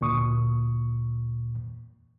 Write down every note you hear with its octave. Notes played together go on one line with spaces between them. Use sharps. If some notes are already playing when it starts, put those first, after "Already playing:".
D2 A#2 C#6 D#6